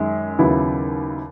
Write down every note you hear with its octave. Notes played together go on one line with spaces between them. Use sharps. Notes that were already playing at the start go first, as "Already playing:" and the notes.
Already playing: F#2 D#3 G#3
D#2 C#3 F#3 B3 E4